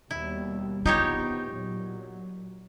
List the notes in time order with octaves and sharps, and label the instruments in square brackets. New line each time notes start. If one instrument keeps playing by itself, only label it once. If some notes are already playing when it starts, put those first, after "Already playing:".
[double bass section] D#2 B2 G3 [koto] E4
[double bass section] E2 C3 B3 [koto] D#4 G4 C#5 [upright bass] F4
[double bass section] A#2 F#3